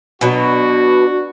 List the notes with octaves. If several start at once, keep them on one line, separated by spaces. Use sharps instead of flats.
B2 F#3 D4 F#4